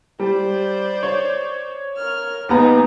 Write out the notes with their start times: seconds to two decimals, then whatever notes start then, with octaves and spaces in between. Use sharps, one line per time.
0.20 G3 C5 D5
1.03 C#5
1.96 A#4 F6
2.49 D#2 G#3 B3 D#4 A#5